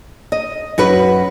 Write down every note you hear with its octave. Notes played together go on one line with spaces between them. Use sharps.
D#5
F#2 F#4 B4